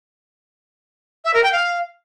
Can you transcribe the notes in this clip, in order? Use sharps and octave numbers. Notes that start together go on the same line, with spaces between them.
E5
A#4
G5
F5